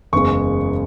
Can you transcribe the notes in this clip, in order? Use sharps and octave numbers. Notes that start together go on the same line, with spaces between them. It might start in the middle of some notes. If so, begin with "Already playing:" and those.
F#1 E2 C#3 G#3 C#6